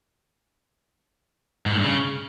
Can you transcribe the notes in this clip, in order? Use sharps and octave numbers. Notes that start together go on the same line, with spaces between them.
G#2
A2
G2
C#3